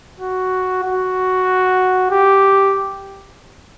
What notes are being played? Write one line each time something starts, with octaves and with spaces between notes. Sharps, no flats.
F#4
F#4
G4